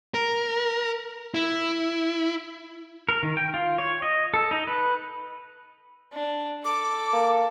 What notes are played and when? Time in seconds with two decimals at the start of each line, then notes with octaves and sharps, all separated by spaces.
0.14 A#4
1.34 E4
3.09 A#4
3.23 D#3
3.37 G5
3.54 F4
3.78 C#5
4.02 D#5
4.34 A4
4.51 D#4
4.67 B4
6.14 D4
6.65 A4 D6
7.13 A#3